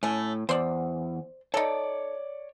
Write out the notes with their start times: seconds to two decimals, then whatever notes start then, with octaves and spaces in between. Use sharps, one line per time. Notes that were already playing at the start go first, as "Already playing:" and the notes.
0.03 A2 A3 C#4
0.49 E2 C5 D5
1.54 D#4 A4 C#5 D5